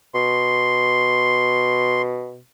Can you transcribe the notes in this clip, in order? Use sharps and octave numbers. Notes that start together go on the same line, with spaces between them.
B2 C6